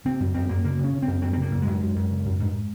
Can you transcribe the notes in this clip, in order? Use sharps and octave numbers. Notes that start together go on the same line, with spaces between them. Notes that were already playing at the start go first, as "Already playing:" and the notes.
C#3 C4
F#2
F#2 C4
F#2 A#3
C#3 A#3
C#3
C#4
C#3
F#2 C4
F#2 C4
C4
C#3 A#3
F#2
F#2 G#3
F#2
F#2
C#3
F#2
G#2